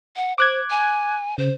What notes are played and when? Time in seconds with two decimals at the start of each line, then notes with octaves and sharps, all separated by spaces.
0.16 F#5
0.38 C5 D6 F#6 G#6
0.70 G#5
1.38 C#3 C5